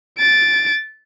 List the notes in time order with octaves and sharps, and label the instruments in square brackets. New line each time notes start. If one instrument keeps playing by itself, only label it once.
[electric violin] A6 D7